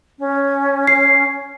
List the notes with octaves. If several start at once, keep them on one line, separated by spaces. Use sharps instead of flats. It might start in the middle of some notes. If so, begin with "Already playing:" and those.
C#4
C7